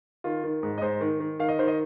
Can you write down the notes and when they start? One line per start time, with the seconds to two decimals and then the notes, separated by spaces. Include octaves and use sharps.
0.24 D#3 F4
0.44 D#3
0.63 G#2
0.78 D#5
0.81 G#2 C5
1.01 D#3
1.20 D#3
1.39 D#3 F5
1.49 D#5
1.59 D#3 C5
1.68 D#5